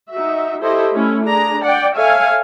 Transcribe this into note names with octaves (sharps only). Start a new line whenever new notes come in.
D#4 F#4 E5
E4 G4 A4 C5 D#5 E5
A3 C#4 E4
D4 G#4 A#5
D5 F#5 G5
A4 C#5 E5 F5 G#5